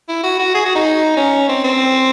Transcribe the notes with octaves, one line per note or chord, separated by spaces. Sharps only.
E4
F#4
F#4
G#4
F#4
D#4
C#4
C4
C4